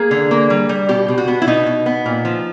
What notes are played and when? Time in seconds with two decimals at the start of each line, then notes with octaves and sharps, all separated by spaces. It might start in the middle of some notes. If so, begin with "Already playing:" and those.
Already playing: A#3 G#4
0.11 D3
0.31 A#3
0.50 G3
0.69 G3
0.88 B2 G4
1.08 B2
1.18 F#4
1.28 B3
1.42 E4
1.47 B2 D#4
1.66 B2
1.86 B3
2.06 A#2
2.25 F3